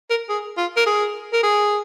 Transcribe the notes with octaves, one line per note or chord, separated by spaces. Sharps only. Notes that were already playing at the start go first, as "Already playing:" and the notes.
A#4
G#4
F4
A#4
G#4
A#4
G#4